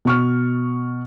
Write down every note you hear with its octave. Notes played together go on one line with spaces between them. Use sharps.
B2 C#6 F6